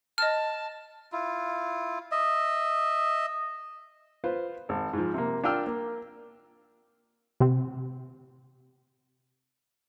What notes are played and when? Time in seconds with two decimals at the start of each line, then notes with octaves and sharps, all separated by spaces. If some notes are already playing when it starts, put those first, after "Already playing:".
0.18 D#5 A5 F6
1.12 E4 F4
2.11 D#5 E5
4.24 F4 B4 C5
4.69 G#1
4.93 G#2 F3
5.14 C3 A#3
5.43 D4 F4 A#4 G5 E6 F6
5.67 A#3
7.40 C3 C4